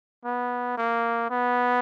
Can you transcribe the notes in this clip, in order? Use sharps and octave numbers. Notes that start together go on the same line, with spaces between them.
B3
A#3
B3